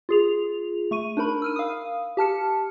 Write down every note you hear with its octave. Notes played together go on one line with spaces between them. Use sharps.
F4 G#4 F7
A3 C#6 D#7
D4 D#4 A#4 B5
E6 F6 D#7
F5 D#6
G4 A5 F6 C#7